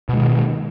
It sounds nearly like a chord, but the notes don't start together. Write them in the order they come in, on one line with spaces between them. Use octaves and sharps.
B2 G#3 D#3